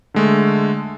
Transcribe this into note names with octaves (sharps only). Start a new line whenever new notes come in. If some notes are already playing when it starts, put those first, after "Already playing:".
D3 G#3 A3